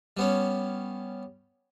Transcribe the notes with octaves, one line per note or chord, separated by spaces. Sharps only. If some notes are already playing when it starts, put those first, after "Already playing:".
G3 B3 C#4